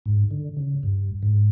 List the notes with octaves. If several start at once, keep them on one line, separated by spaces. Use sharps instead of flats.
G#2
D3
C#3
G2
G#2